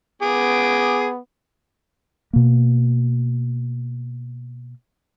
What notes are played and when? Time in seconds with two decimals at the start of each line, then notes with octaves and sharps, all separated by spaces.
0.22 B3 G#4 D6
2.33 B2 A#3